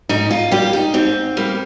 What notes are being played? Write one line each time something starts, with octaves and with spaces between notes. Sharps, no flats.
G#2 D#4
F4
G3 A#3 G4
D#4
G#2 C4
G3 A#3